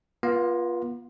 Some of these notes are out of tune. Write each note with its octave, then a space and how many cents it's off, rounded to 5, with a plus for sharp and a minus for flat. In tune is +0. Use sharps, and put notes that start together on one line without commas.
B3 -35 F4 +0